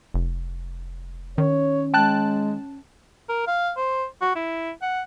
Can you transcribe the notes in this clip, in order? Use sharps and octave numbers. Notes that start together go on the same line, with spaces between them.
F1
D#3 C#4 C#5
G#3 G5 A5 F#6
A#4
F5
C5
F#4
E4
F#5